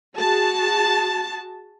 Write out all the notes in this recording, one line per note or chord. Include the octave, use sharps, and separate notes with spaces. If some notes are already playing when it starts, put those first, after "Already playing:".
F#4 G#4 A5